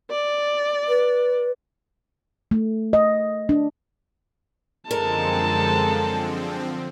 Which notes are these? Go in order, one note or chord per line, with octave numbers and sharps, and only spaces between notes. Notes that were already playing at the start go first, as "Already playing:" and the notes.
D5
B4
A3
D#5
D4
F#2 D3 F3 G#3 C4 A4 A#4 A5